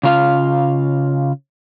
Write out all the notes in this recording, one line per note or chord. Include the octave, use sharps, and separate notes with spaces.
C#3 F4 F5